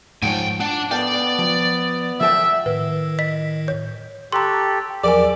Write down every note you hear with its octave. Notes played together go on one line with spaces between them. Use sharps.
G#2 F3 C#5 G5 G#5
D4 F#5
B3 A4 D5 F5 G5
F3
F3 A4 E5 G5
A2 D#3 B4
D#5 B6
C#5
G4 A4 A#5 C6 C#6 F#6
G5
E2 F3 F#3 G#4 A#4 D5 G#5 D6